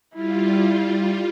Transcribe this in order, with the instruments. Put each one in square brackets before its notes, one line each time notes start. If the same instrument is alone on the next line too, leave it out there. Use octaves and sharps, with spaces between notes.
[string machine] G3 F4 [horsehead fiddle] E4